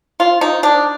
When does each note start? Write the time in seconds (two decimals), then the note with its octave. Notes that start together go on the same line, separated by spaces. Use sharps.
0.20 F4
0.41 D#4
0.63 D4